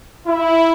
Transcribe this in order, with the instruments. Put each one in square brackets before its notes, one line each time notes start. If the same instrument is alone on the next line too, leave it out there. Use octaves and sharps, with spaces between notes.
[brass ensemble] E4